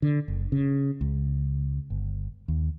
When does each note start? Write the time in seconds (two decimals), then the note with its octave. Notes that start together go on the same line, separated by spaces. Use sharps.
0.02 D3
0.28 F#1
0.52 C#3
1.01 C#2
1.90 G1
2.48 D#2